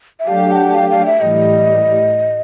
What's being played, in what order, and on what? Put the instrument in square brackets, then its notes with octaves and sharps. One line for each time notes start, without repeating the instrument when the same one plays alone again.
[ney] E5
[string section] F#3 A3 D4 G4 [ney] F5
[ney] G5
F#5
F5
F5
E5
[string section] A2 E3 G3 [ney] D#5